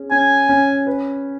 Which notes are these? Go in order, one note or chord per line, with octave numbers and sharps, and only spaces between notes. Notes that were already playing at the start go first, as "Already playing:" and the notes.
Already playing: C#4 G#4
C#4 G#5
C#4
B4